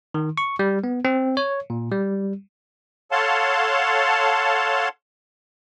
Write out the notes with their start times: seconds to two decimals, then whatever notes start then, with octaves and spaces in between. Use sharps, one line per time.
0.14 D#3
0.38 C#6
0.59 G3
0.84 B3
1.05 C4
1.37 C#5
1.70 A#2
1.91 G3
3.12 A4 C#5 F5 F#5 A5 C6